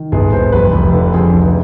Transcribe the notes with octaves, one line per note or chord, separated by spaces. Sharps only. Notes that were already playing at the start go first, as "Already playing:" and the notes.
Already playing: D#3
G1 G#4
G1 C5
F1 B4
F1
D3
F2 G#4
F1
B4